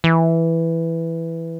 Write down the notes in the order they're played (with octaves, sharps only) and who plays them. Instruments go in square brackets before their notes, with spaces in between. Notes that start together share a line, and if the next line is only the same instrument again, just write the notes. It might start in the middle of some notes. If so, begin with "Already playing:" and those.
[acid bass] E3